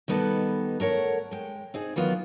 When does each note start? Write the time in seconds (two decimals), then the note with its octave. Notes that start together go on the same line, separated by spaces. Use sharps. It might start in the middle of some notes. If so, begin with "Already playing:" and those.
0.08 D#3 G3 B3 D#4 A4 B4
0.80 A3 A#4 C#5 F#5
1.31 G#3 G5
1.74 C4 D#4 G#4
1.96 D#3 E3 F#3 B3 F4